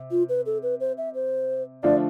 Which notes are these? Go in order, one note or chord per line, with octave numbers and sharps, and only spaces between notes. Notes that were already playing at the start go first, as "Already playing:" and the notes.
Already playing: C3
F4
B4
A4
B4
C5
E5
C5
D3 F3 A3 D4 F4 D5